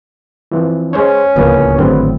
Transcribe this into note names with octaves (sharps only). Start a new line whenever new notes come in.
E3 F3 C4
G#3 C#4 C5 C#5
D1 C#2 F3 A#3 B3
G#1 A2 D3 F#3 B3 C4